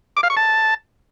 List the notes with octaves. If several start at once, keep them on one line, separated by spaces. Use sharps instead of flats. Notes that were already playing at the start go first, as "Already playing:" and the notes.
D6
F5
C#6
A5